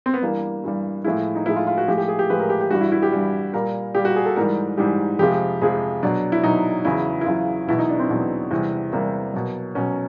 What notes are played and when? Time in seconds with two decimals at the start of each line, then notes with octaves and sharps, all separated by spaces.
0.06 C4
0.14 B3
0.22 G2 E3 G3 A#3
0.64 G2 E3 G3
1.04 A2 F3 G#3 E4
1.36 D#4
1.46 A2 F3 G#3 E4
1.56 F4
1.67 F4
1.78 F#4
1.88 A2 F3 G#3 G4
1.98 G4
2.08 G#4
2.19 G4
2.30 A2 F3 G#3 B4
2.40 A#4
2.50 G4
2.61 G4
2.71 G2 E3 G3 F#4
2.81 E4
2.92 E4
3.02 G4
3.12 G2 E3 G3
3.53 A#2 G3 A#4
3.95 A#2 G3 G4
4.05 F#4
4.16 G#4
4.26 A4
4.36 G#2 E3 G3 A#4
4.77 G#2 E3 G3 G4
5.19 F2 C3 F3 G#3 G4
5.61 F2 C3 F3 G#3 G#4
6.03 B2 F#3 D4
6.32 E4
6.44 B2 F#3 D#4
6.85 E2 C#3 F#3 E4
7.21 E4
7.26 E2 C#3 F#3 F4
7.68 E2 B2 F#3 E4
7.79 D#4
7.89 D4
7.99 C4
8.10 E2 B2 F#3
8.50 E2 C3 E3 G3
8.92 E2 C3 E3 G3 A#3
9.34 B2 F#3
9.75 B2 F#3 C#4